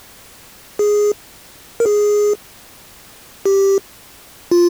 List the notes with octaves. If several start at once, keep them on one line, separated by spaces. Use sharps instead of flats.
G#4
A#4
G#4
G4
F4